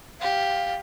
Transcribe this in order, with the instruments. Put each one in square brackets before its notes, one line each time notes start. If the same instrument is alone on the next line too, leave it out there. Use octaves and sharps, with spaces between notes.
[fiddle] G4 [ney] F5